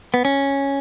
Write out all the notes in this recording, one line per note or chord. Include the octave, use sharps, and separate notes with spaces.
B3
C#4